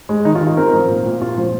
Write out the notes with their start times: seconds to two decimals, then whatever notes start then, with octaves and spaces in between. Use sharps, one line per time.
0.09 G#3
0.25 D#3 D#4
0.35 F4
0.41 D#3
0.47 F4
0.57 C4 A#4
0.73 F3
0.89 A#2
1.06 A#2
1.21 C4 F4
1.38 F3